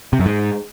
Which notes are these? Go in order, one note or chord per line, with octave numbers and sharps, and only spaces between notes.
C3
F#2
G#2